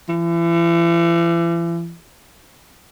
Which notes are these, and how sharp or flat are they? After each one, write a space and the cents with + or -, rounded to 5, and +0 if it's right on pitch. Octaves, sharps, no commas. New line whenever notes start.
E3 +40